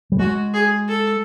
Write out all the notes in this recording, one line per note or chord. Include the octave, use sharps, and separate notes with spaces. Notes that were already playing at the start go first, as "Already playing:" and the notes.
G3
G#3 F#4
G#4
A4